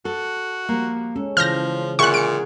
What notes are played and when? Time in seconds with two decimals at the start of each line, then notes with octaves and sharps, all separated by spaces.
0.05 F#4 A4
0.69 F3 G3 A#3
1.16 G#3 C#4 A4
1.37 C#3 E3 F3 F6 G6 A#6
1.99 A#2 D3 E4 G#4 F#5 C#6 F#6
2.14 G#4 C#7 D7